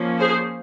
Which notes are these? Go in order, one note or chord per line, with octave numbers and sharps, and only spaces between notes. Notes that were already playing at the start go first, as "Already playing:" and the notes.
Already playing: F3 A#3 C#4
G#4 C5